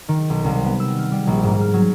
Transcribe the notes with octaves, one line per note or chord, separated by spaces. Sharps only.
D#3
B1
C2
B3
E6
F6
G3
A#1
G#2
F6
F#3